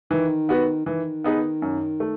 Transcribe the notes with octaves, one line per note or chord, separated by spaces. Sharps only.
D#3 E3
B3 F#4 B4
D#3 E3
B3 D#4 G#4 B4
F#2
A3